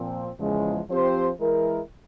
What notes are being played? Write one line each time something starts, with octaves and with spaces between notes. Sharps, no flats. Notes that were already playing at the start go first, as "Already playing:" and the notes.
Already playing: A#2 F3 C4
E2 C#3 F3 G#3
F3 C4 G4 C5
E3 G#3 E4 A#4